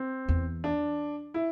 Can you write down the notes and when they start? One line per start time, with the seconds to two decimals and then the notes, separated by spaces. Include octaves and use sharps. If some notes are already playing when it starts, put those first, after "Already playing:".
Already playing: C4
0.29 E2
0.64 D4
1.34 E4